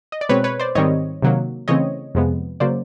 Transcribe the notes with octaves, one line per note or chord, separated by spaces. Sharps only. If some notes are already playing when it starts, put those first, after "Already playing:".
D#5
D5
B2 G#3 C4 B4 C#5
B4 C#5
C5 D5
G#2 D#3 G3 C4 C#5 D#5
C3 D#3 F#3 A#3
C#3 E3 A3 C4 C#5 D#5
F2 C3 F3 G#3 B3
C#3 F#3 A#3 C5 D5